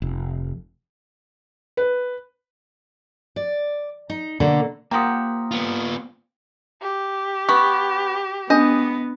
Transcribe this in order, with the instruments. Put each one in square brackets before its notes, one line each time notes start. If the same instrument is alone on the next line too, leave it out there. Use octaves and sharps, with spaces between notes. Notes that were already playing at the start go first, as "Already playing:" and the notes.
[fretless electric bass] F1
[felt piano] B4
[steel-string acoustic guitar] D5
D#4
[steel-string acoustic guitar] B2 A#3 [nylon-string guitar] D3
[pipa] F3 G4 [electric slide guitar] A#3 A#4 F#5 [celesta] A#5 C6 D#6
[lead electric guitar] B3 F4
[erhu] G4
[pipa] B3 [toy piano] C#6
[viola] B3 [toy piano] D4 [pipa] D#5